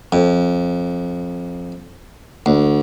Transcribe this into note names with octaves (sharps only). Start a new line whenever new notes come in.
F2
D2